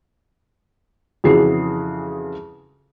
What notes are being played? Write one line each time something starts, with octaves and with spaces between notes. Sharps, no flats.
F2 C#3 E3 F#4 G#4 C7